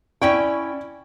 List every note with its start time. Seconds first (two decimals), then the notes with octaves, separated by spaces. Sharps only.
0.21 C#4 E4 D5 G5 C#6